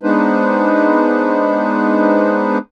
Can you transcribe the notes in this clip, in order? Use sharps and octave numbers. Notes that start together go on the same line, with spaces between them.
G#3 B3 D4 D#4 B4 C5